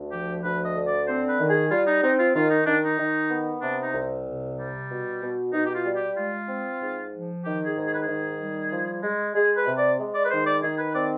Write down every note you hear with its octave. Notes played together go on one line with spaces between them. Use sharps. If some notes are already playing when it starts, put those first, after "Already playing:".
Already playing: D2
F3 G4
D2 B4
D#5
D3
D5
C4 C5
B4
D#3
G#4
G3 F4
D#4
C4 D#4
F4
D#3 F4
D#4
D#3 D4
D#4
D#3
B3
C3 D4
D#4
C2
C3
G3
B2
B2
B2 D#4
G4
F4
G3
G4
G#3 F4
C4
G#2
F3
D#3 G4
G#4
G#2
G#4
B4
D#3 G#4
G3
F3
G#3
G#3 G#4
B4
C3
D5
G#3
D5
B4
D#3 C5
D5
D#3 G#4
B4
C4 D5